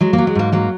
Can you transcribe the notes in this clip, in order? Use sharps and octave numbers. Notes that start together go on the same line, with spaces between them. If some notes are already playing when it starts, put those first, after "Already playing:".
F#3 G#3
A#3
F#3
G#3
G#2 A#3
F#3 A#3